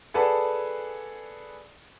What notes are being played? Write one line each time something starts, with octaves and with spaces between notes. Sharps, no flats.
G#4 A4 B4 D5 F#5 A5